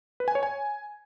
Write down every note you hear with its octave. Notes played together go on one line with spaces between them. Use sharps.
B4
G#5
C#5
G#5